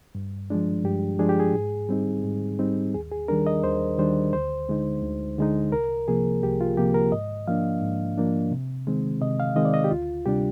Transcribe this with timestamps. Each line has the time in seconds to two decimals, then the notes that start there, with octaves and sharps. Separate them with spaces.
0.15 G2
0.50 F3 G#3 D4
0.85 G2 G4
1.19 F3 G#3 D4 G#4
1.29 G4
1.40 G#4
1.54 G#2
1.89 G3 C4 D#4
2.24 G#2
2.59 G3 C4 D#4
2.95 D#2 G#4
3.12 G#4
3.28 D#3 G3 D4 A#4
3.47 D#5
3.64 D#2 C5
3.98 D#3 G3 D4 C5
4.33 D2 C5
4.69 D3 G#3 D#4
5.03 D2
5.38 D3 G#3 D#4
5.72 C2 A#4
6.08 C3 F3 A#3 G#4
6.43 C2 G4
6.61 F4
6.77 C3 F3 A#3 G4
6.94 A#4
7.12 G#2 D#5
7.47 F3 A#3 D4 F5
7.82 G#2
8.18 F3 A#3 D4
8.51 C3
8.87 D#3 G#3 C4
9.21 C3 D#5
9.40 F5
9.56 D#3 G#3 C4 D#5
9.65 D5
9.74 D#5
9.84 G4
9.91 D2 F4
10.26 C3 G3 D4 G4